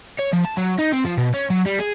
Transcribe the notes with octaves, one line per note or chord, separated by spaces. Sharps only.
C#5
F3
A5
F#3
D#4
C4
F3
B2
C#4
F#3
G3
G#4